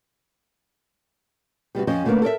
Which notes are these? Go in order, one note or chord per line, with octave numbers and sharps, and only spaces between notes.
C3 G3 B3 F#4
F2 F3 C#4 C5 D#5
D3 A3 A#3 C#4 A#4 B4
A4 A#4 D5 E5